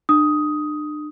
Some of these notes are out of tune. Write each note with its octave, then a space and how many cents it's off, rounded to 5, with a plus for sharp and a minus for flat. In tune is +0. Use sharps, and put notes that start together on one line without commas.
D4 +35 D#6 +10